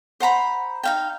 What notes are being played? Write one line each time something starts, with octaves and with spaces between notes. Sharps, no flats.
C5 F#5 A#5 B5
D#4 F5 G5